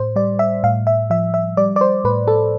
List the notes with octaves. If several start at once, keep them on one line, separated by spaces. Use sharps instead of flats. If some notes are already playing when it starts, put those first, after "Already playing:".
Already playing: A2 C5
G3 D5
E5
A2 F5
E5
F3 E5
E5
G3 D5
D5
C5
A2 B4
A4